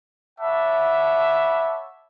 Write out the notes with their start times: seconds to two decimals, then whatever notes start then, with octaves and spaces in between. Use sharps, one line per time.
0.39 C#5 E5 F#5 A5 B5 D6